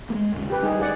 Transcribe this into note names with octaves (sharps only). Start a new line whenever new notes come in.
G#3 A#3
D#2 C#3
G4 B4
G3 D#4 G#4
C#2 G#4 D5 F#5